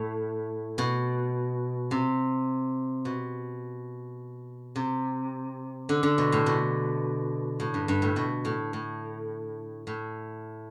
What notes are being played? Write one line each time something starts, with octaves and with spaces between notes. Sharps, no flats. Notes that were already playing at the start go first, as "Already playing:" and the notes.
Already playing: A2
B2
C3
B2
C3
D3
D3
B2
A2
B2
A2
G2
G2
A2
B2
A2
A2
A2